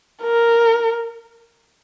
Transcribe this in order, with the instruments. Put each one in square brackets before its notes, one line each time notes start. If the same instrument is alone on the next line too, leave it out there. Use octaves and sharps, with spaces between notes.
[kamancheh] A#4